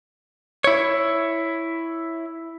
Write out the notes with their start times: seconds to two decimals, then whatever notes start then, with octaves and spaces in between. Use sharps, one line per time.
0.64 E4 C#5